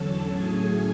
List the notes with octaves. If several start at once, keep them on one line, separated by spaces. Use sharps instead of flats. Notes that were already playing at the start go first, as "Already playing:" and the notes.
Already playing: E2 D3 F#3 C#4 A4 A5
A2 F#3 A3 C#4 G#4 G#5